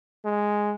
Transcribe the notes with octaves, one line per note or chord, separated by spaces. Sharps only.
G#3